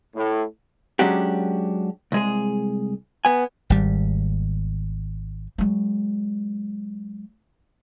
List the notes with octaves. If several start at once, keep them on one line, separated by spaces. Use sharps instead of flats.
A2
F#3 G#3 C#4 D4 F#4 G4
C2 G#3 G#4
B3 G#5
G#1 G3
F#3 G#3